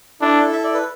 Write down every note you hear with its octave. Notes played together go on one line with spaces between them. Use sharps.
D4 E4 A4
E5
D5
B4